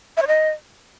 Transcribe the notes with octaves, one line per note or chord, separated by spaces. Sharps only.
E5
C#5
D#5